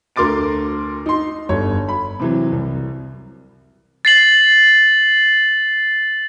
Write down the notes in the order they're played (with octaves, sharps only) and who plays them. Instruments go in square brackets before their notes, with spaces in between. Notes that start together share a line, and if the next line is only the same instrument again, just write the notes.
[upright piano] D2 A#4 C6 D6 A6 D7
D#4 C6
G1 C#5
B5
C3 E3 F#3
C2
[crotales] A6 C7 F#7